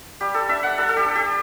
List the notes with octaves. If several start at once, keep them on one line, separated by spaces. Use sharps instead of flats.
G3 G4
A4
D4 E5
F#5
G3 A4
A4
G4
D4
G4